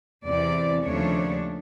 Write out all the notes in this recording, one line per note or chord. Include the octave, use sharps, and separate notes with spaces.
E2 C3 E3 D5
D#2 C#3 F3 A3 D4 C#5